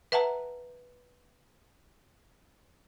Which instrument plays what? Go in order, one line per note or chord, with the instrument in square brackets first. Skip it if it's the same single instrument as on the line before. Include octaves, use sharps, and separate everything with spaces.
[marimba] B4 E5 F#5 A5 A#5